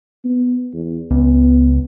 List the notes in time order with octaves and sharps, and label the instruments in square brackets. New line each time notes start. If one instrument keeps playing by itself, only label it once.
[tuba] B3
E2
[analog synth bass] C#2 [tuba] B3